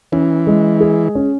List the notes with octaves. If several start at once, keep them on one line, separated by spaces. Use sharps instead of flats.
E3 C#4
G#3
G#4
C#4